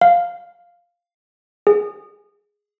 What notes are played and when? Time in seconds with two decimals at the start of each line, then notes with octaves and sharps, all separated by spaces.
0.01 F5
1.67 G#4